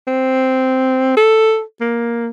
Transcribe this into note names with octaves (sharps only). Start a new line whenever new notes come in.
C4
A4
A#3